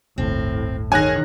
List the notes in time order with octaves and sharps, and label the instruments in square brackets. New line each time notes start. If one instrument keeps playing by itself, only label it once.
[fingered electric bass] D1 G1 [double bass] A2 [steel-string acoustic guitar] C4
[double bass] D#3 [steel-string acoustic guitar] G#4 C#5 [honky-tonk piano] G#5 F#6 A#6